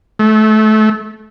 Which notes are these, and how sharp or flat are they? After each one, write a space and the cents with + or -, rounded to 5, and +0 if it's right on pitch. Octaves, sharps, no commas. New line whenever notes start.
A3 -25